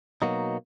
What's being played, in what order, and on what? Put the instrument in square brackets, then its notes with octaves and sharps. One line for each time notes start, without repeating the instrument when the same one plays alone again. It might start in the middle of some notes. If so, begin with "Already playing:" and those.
[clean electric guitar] B2 F#3 A#3 D#4 F#4